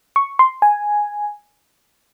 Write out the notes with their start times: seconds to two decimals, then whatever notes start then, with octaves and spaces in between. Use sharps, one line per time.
0.16 C#6
0.39 C6
0.62 G#5